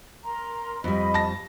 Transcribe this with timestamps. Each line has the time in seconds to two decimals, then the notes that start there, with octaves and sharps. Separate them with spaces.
0.24 A#4 A#5 C6
0.84 F2 G3 D#5 B5
1.14 A5 A#6